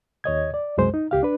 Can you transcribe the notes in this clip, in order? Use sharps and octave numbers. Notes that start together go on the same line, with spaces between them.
D#2 C#5 D#5 G#6
D5
C2 F#2 G#3 C5
D#4
C#2 G4 F5
D4 B4